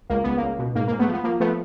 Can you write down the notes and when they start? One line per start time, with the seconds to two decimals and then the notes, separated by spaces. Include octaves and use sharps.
0.10 C#2 A#3
0.24 C#2 B3
0.37 A#3
0.42 C#2
0.59 B2
0.75 G#2 A#3
0.88 A#3
0.91 G#2
0.99 A3 B3
1.08 F3
1.14 B3
1.24 F3 A#3
1.40 F3 A3 B3